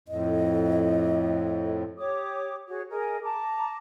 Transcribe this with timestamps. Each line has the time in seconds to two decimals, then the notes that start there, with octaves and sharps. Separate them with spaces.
0.08 F2 A2 D#5
1.97 G4 C#5 D6 D#6
2.67 F#4 G#4 C#5
2.90 G#4 A#4 D#5 G#5
3.23 A5 A#5 D6